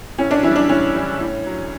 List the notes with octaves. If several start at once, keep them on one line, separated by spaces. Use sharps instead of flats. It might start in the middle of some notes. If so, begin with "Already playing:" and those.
A2 C#4
D4
E3 G3 C#4 E4
D4
A2 C#4
E3 G3
A2
F#3